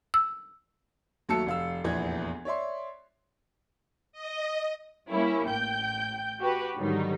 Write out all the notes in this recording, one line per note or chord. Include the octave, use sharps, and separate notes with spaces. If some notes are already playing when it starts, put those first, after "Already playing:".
E6
D#2 F#3 A3 A5 E6 C#7
F1 F5 E6
F1 A#1 E2 E3 B3 G#6
C#5 D5 E5 C6
D#5
G3 A#3 C#4 E4
A1 G5 G6
F#4 G4 B4
G#2 D3 D#3 F#3 G3 D#4